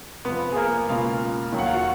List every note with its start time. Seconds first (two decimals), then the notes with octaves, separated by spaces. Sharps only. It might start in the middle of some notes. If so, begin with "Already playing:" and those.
0.25 F1 F2 F3 B3 B4
0.52 G#4
0.56 A#3 A#4
0.88 C#2 B2 A#3 F4 F5
1.52 D#2 D#3 F#3
1.59 F#5
1.66 F5
1.74 F#4 F#5